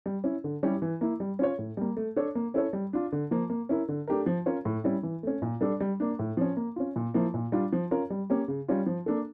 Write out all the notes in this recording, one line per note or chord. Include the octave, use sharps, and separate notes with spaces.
G3
C#4 E4
D3
G3 C#4 E4 G4
E3
A#3 E4
G3
C#4 F4 C#5
A2
G3 A#3
A3
D4 A4 C#5
A#3
C#4 E4 A4 C#5
G3
D4 F4
D3
F3 A#3
A#3
C#4 E4 A#4
D3
A3 D4 G4 A#4
F3
C#4 F4 A#4 C#5
A2
G3 C#4 E4
E3
A3 C#4
A#2
G3 D4 A4 D5
G3
A#3 D4
A2
F3 C#4
A#3
C#4 F4
A#2
F3 A#3 E4
A#2
G3 D4 F4
F3
C#4 F4 A#4
G3
A#3 C#4 G4
C#3
G3 C#4 F4
F3
A#3 D4 A4